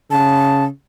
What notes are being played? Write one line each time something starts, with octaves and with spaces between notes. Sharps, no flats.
C#3 A5